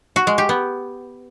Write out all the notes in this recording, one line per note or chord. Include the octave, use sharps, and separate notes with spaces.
F#4
G#3
G4
B3